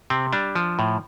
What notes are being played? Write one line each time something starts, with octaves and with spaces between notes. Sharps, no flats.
C3 C4
G3 D4
F3
A2